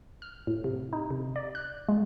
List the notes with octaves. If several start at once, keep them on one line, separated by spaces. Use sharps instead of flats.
F6
A2
C3
D#4
C3
D5
F#6
G#3